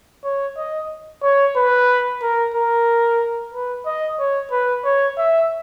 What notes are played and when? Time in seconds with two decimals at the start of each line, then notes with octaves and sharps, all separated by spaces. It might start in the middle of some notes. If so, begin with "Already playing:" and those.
0.24 C#5
0.57 D#5
1.23 C#5
1.57 B4
2.22 A#4
2.54 A#4
3.53 B4
3.86 D#5
4.19 C#5
4.51 B4
4.85 C#5
5.18 E5